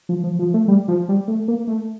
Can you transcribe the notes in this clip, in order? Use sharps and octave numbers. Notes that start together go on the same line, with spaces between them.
F3
F3
F3
A3
G3
F3
G3
A3
A#3
A3